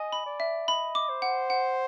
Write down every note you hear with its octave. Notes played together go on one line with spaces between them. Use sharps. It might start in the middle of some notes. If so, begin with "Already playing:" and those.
Already playing: D#5 G#5
B5
D5
E5
D#5 B5
D6
C5
F#5
F#5